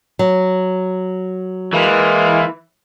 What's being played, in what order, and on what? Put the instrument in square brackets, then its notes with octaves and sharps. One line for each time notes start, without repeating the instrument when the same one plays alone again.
[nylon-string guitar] F#3
[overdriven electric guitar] E3 [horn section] G#3 A#3 F4